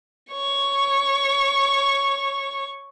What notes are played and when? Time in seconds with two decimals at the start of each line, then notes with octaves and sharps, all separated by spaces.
0.31 C#5 C#6